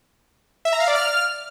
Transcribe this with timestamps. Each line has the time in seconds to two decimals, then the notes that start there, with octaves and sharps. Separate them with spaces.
0.65 E5
0.73 A#5
0.80 F5
0.87 D5
0.95 F6